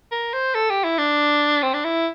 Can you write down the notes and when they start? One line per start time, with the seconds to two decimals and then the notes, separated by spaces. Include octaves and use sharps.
0.11 A#4
0.33 C5
0.55 A4
0.70 G4
0.84 E4
0.98 D4
1.63 C4
1.73 D4
1.84 E4